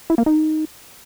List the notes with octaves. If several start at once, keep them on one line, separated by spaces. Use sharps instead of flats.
E4
A#3
D#4